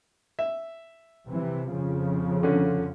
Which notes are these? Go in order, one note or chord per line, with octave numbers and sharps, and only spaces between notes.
E5
C3 E3
F2 C#3 F3
D3 C#4